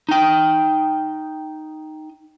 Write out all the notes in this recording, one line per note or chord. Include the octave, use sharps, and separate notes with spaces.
D#4 G5